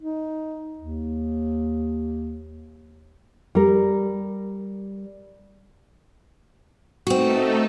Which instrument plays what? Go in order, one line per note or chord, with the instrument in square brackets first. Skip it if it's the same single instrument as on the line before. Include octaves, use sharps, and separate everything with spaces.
[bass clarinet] D#4
D#2
[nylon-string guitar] G3 A#4
[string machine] A3 D#4 A4 [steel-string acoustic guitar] C4 F#4